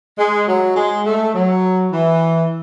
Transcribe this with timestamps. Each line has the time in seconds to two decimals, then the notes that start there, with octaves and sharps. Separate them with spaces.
0.18 G#3
0.47 F#3
0.75 G#3
1.05 A3
1.33 F#3
1.91 E3